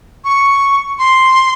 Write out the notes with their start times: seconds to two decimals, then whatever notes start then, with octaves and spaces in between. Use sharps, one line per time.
0.25 C#6
0.99 C6